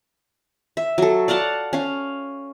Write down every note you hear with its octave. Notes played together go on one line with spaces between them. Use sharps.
E5
F#3 A4
D5 F5 F#5 A5
C#4 F5